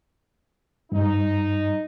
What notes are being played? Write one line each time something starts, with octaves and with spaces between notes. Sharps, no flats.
G2 D#4